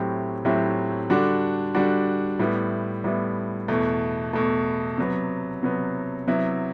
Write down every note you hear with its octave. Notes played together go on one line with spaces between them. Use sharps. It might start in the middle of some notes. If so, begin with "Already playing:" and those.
Already playing: A2 F#3 C4 E4 G4
A2 F#3 C4 E4 G4
D3 G3 D4 F#4
D3 G3 D4 F#4
A2 G3 B3 E4
A2 G3 B3 E4
E2 B2 A3
E2 B2 A3
C3 F#3 B3
C3 F#3 B3
C3 F#3 B3 E4